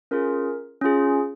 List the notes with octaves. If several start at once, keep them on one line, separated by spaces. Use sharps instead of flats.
C#4 F4 G#4 A#4
C#4 F4 G#4